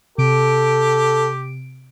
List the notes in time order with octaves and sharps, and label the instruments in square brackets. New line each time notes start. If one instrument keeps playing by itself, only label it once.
[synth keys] C3 D7 [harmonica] G4 [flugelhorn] A4